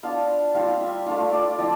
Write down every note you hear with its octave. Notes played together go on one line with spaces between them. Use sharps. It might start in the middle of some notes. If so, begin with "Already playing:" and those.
B3 D4 F4 F5
G3 C4 F4 F5
E5
A3 D4 F4 F5
D5
F3 C4 E4 D5